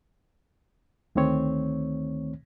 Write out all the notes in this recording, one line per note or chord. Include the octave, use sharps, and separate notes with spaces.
D2 D#3 A3 C4 C#5